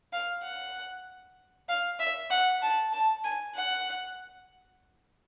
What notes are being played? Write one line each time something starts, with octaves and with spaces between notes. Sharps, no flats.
F5
F#5
F5
E5
F#5
A5
A5
G#5
F#5